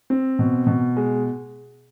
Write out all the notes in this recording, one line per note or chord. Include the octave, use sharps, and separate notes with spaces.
C4
B2
B2
G#3